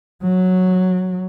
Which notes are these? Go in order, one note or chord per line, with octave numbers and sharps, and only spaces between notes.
F#3